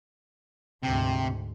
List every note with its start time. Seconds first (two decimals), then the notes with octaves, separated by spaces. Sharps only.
0.83 D2 G#2 C3 G5